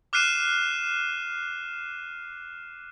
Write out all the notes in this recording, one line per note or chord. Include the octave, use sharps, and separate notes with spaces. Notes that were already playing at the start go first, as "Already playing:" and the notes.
D6 F6 F#6 C7 D#7 E7